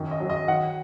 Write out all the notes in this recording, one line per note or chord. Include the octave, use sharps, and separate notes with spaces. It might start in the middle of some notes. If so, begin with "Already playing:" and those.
Already playing: F#2 D#3
D#5
F#3
D#5
D#3 F#5